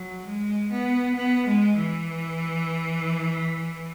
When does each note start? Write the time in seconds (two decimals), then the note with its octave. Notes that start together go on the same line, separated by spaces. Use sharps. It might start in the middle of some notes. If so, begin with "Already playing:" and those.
Already playing: F#3
0.26 G#3
0.71 B3
1.15 B3
1.46 G#3
1.76 E3